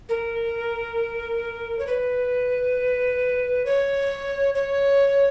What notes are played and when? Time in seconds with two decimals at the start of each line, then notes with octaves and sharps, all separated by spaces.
0.09 A#4
1.79 C#5
1.87 B4
3.66 C#5
4.55 C#5